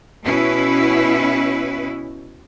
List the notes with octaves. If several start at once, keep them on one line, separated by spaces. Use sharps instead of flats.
B2 C#4 E4 B4